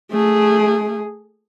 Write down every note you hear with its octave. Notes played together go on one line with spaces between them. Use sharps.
A3 G#4